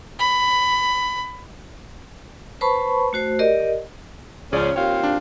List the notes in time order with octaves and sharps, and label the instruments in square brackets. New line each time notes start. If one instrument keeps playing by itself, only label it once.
[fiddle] B5
[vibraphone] B4 C5 A5 B5 C#6
A3 F#4 C5
G4 A#4 D5 D#5
[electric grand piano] C#2 G#4 D5 [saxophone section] F3 C#4
[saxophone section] D#2 C4 F4 [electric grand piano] C#5
[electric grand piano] D4